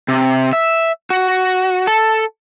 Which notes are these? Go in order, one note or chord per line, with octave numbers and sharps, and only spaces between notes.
C3
E5
F#4
A4